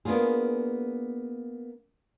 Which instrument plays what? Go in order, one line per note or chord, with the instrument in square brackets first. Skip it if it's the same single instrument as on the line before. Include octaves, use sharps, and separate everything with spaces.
[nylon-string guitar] A#3 B3 C#4 D4 F4 G#4